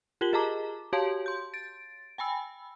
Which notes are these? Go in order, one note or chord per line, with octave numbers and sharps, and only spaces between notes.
F4 G4 A#4 F#7 G7
G#4 D#5 A5 A#5 D6
F#4 G4 C#5 F5 A5 C6
C6 G6
A6 D7
G5 G#5 B5 E6